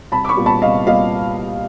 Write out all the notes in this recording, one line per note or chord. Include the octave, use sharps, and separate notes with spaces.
C2 A5 B5
D6
B5 C#6
A#2 G3 B3
A5 B5
C2 D#5 F5
A#2 G3 B3 D#5 F5